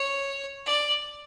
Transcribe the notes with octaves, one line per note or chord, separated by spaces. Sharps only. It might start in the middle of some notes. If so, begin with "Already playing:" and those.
Already playing: C#5
D5